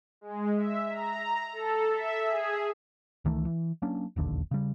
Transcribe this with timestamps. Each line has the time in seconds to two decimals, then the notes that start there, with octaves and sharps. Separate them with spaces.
0.21 G#3
0.56 E5
0.90 A#5
1.53 A4
1.91 E5
2.24 G#4
3.25 C#2 D#3 E3 A3
3.45 E3
3.82 F#3 A#3 C#4 D4
4.16 E1 A#1 D#2 D3
4.51 C#3 G3